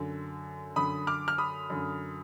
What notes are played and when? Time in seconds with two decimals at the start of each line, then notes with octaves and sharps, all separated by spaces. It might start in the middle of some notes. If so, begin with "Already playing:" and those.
Already playing: F#2 D3
0.76 F#2 D3 B5 D#6
1.07 D6 F6
1.28 F6
1.38 B5 D#6
1.70 F#2 D3